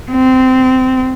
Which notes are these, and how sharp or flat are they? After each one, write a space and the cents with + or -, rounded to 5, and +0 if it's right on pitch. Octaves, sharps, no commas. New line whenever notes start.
C4 -20